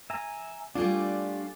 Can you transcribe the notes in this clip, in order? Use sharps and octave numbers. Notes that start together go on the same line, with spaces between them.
E5 G#5 A#5
G3 A3 D4 F4 D5 G#5